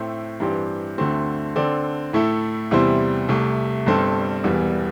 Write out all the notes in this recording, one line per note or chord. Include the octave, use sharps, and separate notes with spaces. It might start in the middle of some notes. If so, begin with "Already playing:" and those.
Already playing: A2 A3 C4 A4
G2 E3 C4 G4 D5
D2 D3 A3 C4
D3 C4 A4 D5
A2 A3 E4 A4
E2 C3 G3 E4 C5
C2 C3 A3
G1 G2 G3 C4 A4
E1 E2 E3 G3